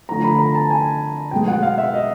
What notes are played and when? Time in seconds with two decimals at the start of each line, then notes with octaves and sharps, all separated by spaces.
0.09 D3 F3 A3 A#5
0.24 B5
0.39 A#5
0.55 A5
0.70 G#5
1.31 B2 G#3 G5
1.48 F#5
1.63 F5
1.78 E5
1.94 D#5